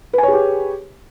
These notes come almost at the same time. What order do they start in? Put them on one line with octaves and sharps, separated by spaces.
B4 G#5 C#5 G#4 G4